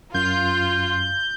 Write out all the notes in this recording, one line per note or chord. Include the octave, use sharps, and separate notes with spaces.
F#2 F4 G6